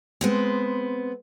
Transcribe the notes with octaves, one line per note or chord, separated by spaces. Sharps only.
G#3 B3 C4